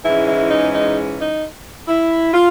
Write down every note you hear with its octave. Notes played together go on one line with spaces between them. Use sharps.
G#2 E3 G#3 C#4 E4
E4
D#4
D#4
D#4
E4
F4